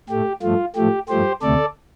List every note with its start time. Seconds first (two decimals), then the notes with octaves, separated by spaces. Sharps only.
0.09 A2 A3 G4
0.42 G2 F3 A3 F4
0.76 A2 F3 A3 G4
1.09 G2 F3 A3 G4 C5
1.42 D2 C3 A3 A4 D5